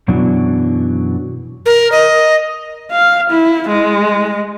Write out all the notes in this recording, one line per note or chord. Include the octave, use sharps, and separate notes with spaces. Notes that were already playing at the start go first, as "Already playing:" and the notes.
F#2 B2 E3 F#3 D4
A#4
D#5
F5
E4
G#3